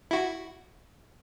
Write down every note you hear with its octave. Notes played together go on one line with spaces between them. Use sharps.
E4 F#4